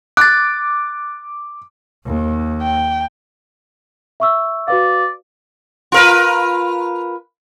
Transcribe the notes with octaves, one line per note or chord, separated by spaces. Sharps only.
D6 F#6 A6
D#2
G5
E5 C#6 E6
F#4 B4 D5 F5
F4 A#4 B4